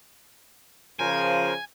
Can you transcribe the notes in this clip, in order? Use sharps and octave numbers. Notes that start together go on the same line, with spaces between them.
C#3 F3 A#4 C5 G#5